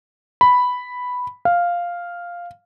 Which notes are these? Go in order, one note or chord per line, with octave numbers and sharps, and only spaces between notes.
B5
F5